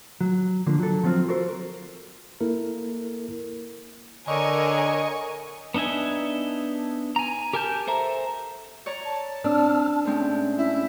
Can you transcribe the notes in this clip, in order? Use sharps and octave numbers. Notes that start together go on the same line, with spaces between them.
F#3
D3 F3 A#3
F#3 A4
F3 F#3 B3 C4 F4
F#4 A4 A#4 C5
A#3 E4 A4 A#4
D3 A#4 C#5 D#5 G#5 C#6
B3 D4 D#4 E5 G#5
G#5 A#5
G4 A#4 G#5 A5 G6
A4 C5 E5 A#5
C#5 D5 A#5
A5
C4 D4 E6 F6
A2 G#3 C4 C#4
E4